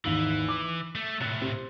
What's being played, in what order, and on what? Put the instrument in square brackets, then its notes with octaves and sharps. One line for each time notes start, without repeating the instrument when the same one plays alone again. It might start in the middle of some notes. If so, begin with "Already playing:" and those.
[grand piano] G#1 D#2 D#3 [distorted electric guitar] E3
[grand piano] D6 E6
[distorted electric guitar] A3
[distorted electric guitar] A2 C3 [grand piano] F#6 A6 C#7
[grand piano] C4 G4